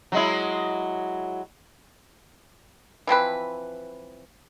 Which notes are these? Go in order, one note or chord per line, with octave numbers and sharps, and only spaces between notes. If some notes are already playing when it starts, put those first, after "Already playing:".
F#3 G#3 E4
E3 F3 C4 B4